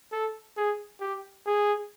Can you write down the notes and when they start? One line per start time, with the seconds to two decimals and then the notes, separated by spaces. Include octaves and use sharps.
0.12 A4
0.57 G#4
1.00 G4
1.46 G#4